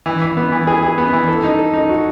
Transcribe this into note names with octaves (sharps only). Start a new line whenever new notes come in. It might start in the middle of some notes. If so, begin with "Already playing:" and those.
E3
E3
B3
E3
G#4
G#4
B3
E3
A4
D#4
A4
D#4
F#4